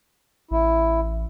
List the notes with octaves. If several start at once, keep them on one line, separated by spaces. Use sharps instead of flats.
A1 E4